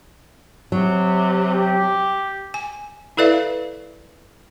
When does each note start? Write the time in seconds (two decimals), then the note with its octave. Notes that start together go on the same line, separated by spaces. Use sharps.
0.72 C3 F#3
1.51 G4
2.54 G#5
3.17 E4 A4 B4 D5 E5 F5